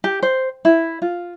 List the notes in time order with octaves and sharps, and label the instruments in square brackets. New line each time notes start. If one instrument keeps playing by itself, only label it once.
[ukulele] G4
C5
E4
F4